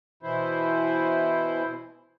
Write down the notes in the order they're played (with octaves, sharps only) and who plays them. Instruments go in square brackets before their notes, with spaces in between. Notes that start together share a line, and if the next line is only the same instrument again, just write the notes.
[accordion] B2 E3 E4 C5